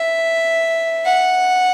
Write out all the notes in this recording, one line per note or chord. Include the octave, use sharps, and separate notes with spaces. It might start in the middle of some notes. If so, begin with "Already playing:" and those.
Already playing: E5
F#5